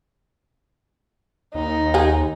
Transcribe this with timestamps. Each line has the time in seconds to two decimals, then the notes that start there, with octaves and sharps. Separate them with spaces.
1.55 D#2 D#4
1.94 G4 G#4